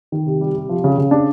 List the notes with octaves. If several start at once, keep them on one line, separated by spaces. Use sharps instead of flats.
D#3
C3
G3
C3
F3
C#3
C#3
D4